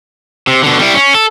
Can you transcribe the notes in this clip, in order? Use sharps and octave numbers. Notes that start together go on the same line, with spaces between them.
C3
B2 D3
G3 E4
C#4
A4